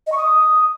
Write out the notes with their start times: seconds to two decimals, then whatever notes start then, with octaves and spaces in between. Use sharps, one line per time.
0.07 D#5
0.12 C#6
0.17 D#6